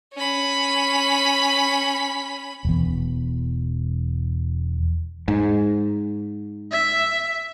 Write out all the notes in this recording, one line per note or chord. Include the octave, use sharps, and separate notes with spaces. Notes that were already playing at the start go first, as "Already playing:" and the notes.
C#4 B5
E1 E2
G#2
E5